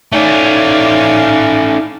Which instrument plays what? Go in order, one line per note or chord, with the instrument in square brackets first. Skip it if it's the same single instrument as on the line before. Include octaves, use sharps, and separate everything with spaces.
[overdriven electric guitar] A3 C#4 [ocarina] D#4 [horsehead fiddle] D5 F5